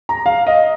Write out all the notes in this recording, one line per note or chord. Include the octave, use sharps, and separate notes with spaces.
A#5
F5
D#5